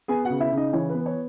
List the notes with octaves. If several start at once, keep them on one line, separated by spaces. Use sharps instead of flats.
B3 G#4 G#5
F#4 F#5
C#3
E4 E5
C#3
D#4 D#5
E3 C#5
B4
B3
B4
C#5